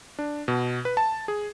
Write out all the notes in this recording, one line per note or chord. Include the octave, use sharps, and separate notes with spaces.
D4
B2
B4
A5
G#4